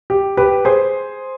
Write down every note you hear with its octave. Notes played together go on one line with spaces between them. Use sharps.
G4
G4 B4
G#4 C5